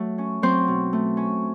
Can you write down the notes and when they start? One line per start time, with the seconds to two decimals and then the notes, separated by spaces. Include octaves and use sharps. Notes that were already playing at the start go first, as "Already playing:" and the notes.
Already playing: F#3 A3
0.18 C#4
0.42 F#3 C4 C5
0.68 B2
0.93 A3
1.17 C#4